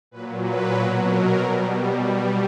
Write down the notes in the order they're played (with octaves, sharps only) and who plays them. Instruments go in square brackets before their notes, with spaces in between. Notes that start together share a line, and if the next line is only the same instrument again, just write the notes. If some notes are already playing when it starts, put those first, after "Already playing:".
[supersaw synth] A#2 F#3 B4
B4
B2 F#3 A#4
A#4
B2 G3
B2 G3 G4